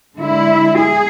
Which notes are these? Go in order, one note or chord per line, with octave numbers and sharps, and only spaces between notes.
D3 G#3 E4
G#4